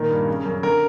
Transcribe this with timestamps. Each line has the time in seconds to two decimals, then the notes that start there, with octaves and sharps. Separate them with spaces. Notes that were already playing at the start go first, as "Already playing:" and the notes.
Already playing: A#2 D#3 A#4
0.10 G2
0.28 C#3
0.45 F#2
0.63 D3 A#4